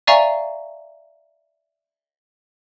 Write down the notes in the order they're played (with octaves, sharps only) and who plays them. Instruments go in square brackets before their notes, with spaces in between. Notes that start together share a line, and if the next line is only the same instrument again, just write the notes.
[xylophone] D5 E5 F5 G#5 A#5 C#6